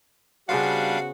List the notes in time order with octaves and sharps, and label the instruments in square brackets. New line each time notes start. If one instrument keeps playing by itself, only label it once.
[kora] C#3 B3 C5 [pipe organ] G3 D4 [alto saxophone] F#4 [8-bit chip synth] F5